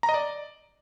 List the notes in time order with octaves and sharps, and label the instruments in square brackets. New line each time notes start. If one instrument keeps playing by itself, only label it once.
[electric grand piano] A#5
D#5
D5